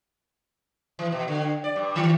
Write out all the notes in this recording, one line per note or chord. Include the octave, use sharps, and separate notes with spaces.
E3
B2
D3
D5
G2
D#3